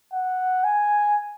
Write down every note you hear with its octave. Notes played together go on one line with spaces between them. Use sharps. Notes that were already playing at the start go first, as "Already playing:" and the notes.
F#5
G#5